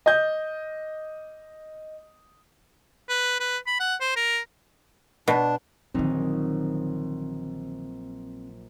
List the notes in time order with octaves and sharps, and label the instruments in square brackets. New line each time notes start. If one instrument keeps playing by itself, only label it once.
[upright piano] D#5 G6
[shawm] B4
B4
B5
F#5
C5
A#4
[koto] B2 [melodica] D4
[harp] A#1 F#3 D#4 [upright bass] D3 D#3 [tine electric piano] C4